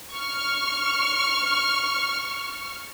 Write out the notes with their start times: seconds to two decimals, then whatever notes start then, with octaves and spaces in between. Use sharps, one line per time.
0.12 C#6 F6